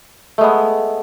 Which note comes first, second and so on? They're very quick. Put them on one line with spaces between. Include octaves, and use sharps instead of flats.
A3 G#3 B3